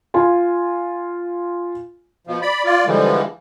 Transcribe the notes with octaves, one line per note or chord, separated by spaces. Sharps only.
F4 G#5
B2 F3
D5 B5
F4 D5
D3 E3 F3 G3 G#3